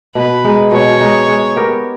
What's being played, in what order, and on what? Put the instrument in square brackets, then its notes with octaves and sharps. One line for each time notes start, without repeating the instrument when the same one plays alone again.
[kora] B2 [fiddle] B4
[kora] G#3 D#4
[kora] B2 [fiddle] C#5
[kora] G#3 D#4
G#3
B3 G4 A#4